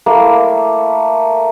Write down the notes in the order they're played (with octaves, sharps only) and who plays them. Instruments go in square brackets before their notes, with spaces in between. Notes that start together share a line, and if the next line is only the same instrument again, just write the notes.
[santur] A3 A#3 E4